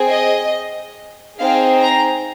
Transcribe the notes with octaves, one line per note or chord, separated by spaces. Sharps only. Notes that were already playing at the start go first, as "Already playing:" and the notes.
Already playing: C4 G#4
D#5
C4 D#4 G#4 F5
A#5